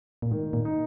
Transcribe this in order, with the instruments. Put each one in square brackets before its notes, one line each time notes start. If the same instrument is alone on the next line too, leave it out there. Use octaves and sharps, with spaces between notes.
[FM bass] A#2
[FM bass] G#2 [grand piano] D#3
[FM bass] A#2
[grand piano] D#4